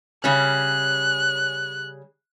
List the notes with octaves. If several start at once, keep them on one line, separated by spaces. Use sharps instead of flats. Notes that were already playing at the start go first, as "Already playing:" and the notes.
C#3 G3 C#4 F#6